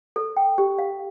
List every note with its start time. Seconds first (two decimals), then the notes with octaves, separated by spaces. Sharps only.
0.16 A4
0.37 G5
0.58 G4
0.79 F5